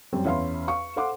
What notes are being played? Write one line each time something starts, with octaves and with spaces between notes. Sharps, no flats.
F#2 G3 C4
E2 C#4 E5 F5 B5 C6
F5 C#6
A4 C5 F5 F#5 C6 D6